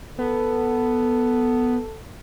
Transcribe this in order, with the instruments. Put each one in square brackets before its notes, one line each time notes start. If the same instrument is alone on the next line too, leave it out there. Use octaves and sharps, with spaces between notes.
[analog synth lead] B3 [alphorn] A4